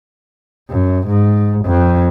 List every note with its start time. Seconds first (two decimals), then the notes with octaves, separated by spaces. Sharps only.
0.70 F#2
1.07 G#2
1.65 F2